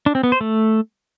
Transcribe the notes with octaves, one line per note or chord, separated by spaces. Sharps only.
D4
C4
B3
C5
A3